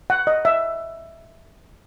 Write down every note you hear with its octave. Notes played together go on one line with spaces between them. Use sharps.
F#5
D#5
E5